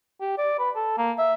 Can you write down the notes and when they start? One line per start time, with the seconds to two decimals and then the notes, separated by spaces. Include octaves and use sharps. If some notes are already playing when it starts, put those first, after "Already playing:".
0.21 G4
0.38 D5
0.59 B4
0.76 A4
0.97 A#3
1.18 E5